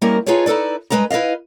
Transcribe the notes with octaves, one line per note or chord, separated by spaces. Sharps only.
G3 A#3 C#4 E4 A#4 D#5
D#4 F4 G#4 A4 B4 C#5
D#4 E4 A4 B4 D5
G2 E3 G#3 B4 D#5 A#5
E4 B4 D5 D#5 F5